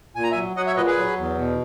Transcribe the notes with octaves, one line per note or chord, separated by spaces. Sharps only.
A#2 G#5
A#5
E5 G#5
F#3
F#3 D#5 F#5
C#5 E5
A#2 B4 D#5
G#4 B4
F#3
E2
B2